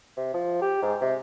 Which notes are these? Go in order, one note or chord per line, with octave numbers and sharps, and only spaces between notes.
C3
F3
G4
G#2
C3